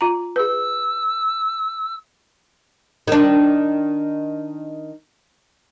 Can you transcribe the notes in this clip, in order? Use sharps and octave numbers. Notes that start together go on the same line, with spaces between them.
F4 A#5
G#4 B4 E6
D#3 D4